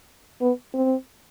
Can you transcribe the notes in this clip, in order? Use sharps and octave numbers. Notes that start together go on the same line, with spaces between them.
B3
C4